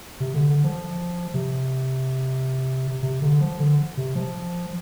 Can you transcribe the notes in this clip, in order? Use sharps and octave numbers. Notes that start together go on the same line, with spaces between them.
C3
D3
D3
F3
C3
C3
D3
F3
D3
C3
F3